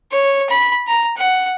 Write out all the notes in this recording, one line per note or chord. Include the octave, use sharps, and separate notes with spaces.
C#5
B5
A#5
F#5